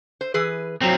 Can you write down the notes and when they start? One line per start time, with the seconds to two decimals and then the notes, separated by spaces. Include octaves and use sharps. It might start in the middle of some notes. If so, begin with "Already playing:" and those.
0.21 C5
0.34 E3 G#4 B4
0.81 F#3 C4